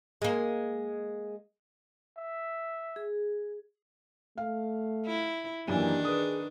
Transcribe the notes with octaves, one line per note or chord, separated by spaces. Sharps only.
G#3 A#3
E5
G#4
A3 F5
E4
F#2 D#3 E3 A#3 D4 G4
G#4 B4 D#6